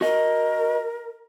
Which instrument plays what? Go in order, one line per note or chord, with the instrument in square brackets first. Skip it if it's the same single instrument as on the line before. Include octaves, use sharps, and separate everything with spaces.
[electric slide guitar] F#4 D#5 [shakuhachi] A#4